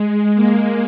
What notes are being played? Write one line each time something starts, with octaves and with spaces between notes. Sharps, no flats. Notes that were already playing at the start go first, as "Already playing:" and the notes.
Already playing: G#3
A#3